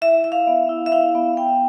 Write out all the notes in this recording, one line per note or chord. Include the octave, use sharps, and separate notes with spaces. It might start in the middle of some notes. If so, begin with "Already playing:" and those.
E4 E5
E4 E5
F5
B3
E4
E5
E4 F5
B3
B3 G5